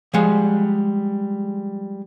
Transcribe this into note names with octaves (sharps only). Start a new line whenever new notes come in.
F3 G3 G#3 F#5